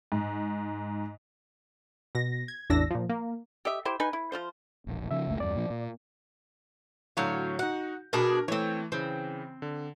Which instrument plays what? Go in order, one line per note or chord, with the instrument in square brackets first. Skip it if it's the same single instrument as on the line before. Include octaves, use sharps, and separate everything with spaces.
[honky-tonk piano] G#2
[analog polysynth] B2 A#6
G#6
A1 E2 D4 E6 A#6
A#2 F3
A#3
[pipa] G4 D#5 E5
E4 G4 C5
D#4 B4 G#5
E4
F3 F4 C5
[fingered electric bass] E1 A#1
[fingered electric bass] C#3 F3 [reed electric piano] E5
[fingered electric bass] F#1 C#2 A3
[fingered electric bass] E2 G2 [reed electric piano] D5
[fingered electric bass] A#2 F3
A#2
[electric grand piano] A2 D3 G6 [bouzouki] F#3 C#5 F5
[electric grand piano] D#4 F#4 [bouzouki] F#5
[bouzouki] B2 D4 G#4 [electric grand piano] A#4
[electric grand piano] E3 A3 [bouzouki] C4 C#5
[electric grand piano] C#3 E3 [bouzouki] C4
[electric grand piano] D3